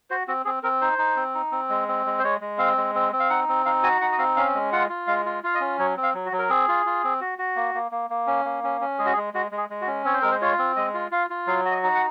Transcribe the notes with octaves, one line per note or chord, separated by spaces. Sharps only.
F#4 C5
C4 F#4
C4 G#4
C4 A#4
D#4 C5
D#4
C4
D#4
C4
G#3
C4
G#3
C5
G#3 C#5
G#3
C4 F5
G#3
C4
C4
F5
D#4 F#5
C4
D#4 F5
F#4 G#5
D#4 F#5
D#5
C4 F5
C#4 F5
G#3
F4 F#5
F4
G#3 F5
F4
F4 F5
D#5
C#4
F#3 C#5
C4
F5
F#3
F#4
F#3
A#4
C4 G#4
F4
F4
C4
F#4
F#4
A#3
A#3
A#3
A#3
C#4
A#3
C#4
C#4
G#3 G#4
F#4
G#4
G#3
G#3 F#4
G#3
G#4
G#3
F#4
C#4
C4 C#5
C5
G#3 A#4
C5
F4 C#5
C4
G#3 D#5
F4
F4 F5
F4
F#3 F5
F#4
D#5
D#4
F#5